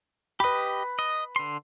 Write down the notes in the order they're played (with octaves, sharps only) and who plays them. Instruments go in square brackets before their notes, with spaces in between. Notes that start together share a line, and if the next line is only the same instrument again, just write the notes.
[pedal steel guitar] G4 D#5 [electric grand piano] B4 B5
[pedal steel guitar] D#5
D3 C6